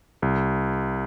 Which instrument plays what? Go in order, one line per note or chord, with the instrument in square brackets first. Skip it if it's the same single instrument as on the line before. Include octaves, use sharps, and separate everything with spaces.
[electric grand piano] C2